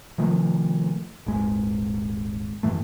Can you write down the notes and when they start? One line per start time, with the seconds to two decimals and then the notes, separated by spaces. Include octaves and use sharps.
0.18 C3 D#3 F3 A3
1.26 D#1 G#1 G#3
2.63 F#2 A2 E3 A3